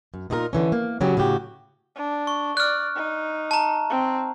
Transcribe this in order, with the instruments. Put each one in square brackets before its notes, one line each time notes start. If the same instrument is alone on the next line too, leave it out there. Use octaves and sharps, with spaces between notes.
[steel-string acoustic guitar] F#2
A#2 D#4 F4 G#4 A#4
D3 E3 C#4
A#3
C#3 F#3 C#4 G4
A2 C#3 F#4 G4
[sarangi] D4
[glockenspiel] C#6
[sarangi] D5 [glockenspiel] F6 F#6
[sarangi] D#4
[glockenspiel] A5 A#5
[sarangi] C4